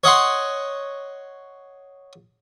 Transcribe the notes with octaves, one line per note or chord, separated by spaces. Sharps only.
C#5 D#5 F#5 C6